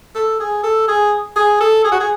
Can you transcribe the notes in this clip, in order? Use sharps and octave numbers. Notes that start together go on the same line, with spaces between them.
A4
G#4
A4
G#4
G#4
A4
G#4
F#4
G#4